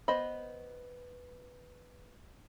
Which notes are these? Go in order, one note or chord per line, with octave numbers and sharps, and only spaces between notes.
B3 C5 D#5 B5